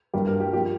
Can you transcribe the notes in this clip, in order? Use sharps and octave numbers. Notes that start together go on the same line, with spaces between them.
G2 G3 A#3 G4
A#4
G4
F3 A#3 G4